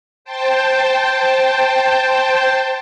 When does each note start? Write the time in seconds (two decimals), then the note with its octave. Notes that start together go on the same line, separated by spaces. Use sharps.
0.25 C5 G5 A5